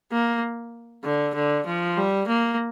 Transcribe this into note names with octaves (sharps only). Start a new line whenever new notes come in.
A#3
D3
D3
F3
G3
A#3